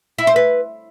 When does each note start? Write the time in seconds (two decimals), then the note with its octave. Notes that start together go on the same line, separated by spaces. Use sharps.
0.18 E4
0.27 C5
0.36 B4